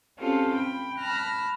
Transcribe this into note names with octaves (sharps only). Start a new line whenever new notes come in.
C4 C#4 F4 G4 A4
G5 B5
A5 B5 F6 F#6 A#6